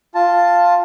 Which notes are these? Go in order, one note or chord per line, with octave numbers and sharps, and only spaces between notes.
F4 A5